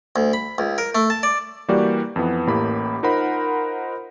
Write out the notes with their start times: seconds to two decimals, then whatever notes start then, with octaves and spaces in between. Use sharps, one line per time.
0.16 D2
0.33 B5
0.58 C#2
0.78 A#4
0.95 A3
1.10 A5
1.23 D5
1.68 E3 G3 A#3 F#4 G4 D5
2.16 F2 E3 B3
2.47 A1 A2 A#3 G4 B5
3.03 D#4 F4 A#4 C5 F#5 B5